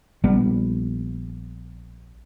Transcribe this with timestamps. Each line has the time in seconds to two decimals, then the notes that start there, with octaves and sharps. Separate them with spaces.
0.24 A#1 G3 B3